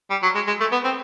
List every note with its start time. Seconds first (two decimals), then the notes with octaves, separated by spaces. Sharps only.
0.10 G3
0.23 F#3
0.35 G#3
0.47 G#3
0.60 A3
0.72 B3
0.85 C4